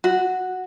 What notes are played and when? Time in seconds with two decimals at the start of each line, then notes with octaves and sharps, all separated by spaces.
0.04 F#4